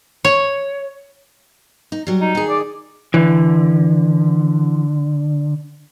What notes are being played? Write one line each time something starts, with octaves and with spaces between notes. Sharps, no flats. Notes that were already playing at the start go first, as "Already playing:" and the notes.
C#5
D#4
F#3 G3
D#4
D#3 G#4
D5
D3 E3